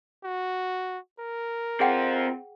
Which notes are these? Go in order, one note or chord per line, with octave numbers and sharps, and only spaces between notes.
F#4
A#4
C4 F4 G#4 F#5 G5